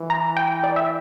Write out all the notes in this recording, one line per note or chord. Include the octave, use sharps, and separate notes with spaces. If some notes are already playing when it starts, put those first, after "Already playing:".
Already playing: E3
A#5
G5
D5
E5